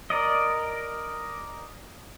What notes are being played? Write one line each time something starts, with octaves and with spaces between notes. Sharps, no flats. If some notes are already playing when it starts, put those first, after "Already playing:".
A#4 D5 D#5